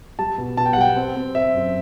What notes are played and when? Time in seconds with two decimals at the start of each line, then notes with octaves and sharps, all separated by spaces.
0.19 G3 A5
0.38 B2
0.57 B2 A5
0.65 G5
0.73 F#5
0.76 G3 G5
0.96 C4
1.16 C4
1.35 C4 E5
1.54 F#2